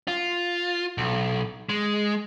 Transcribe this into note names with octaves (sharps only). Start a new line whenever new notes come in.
F4
B1
G#3